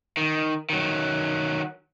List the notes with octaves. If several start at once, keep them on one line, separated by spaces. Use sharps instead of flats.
D#3
D#3 F#3